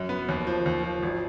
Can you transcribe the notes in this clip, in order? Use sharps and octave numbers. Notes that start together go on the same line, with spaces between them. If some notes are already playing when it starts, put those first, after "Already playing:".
Already playing: F#2
B3
D#2
F3
D#2
F3
G#1